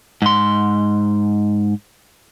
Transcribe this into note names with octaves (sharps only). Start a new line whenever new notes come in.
G#2 C6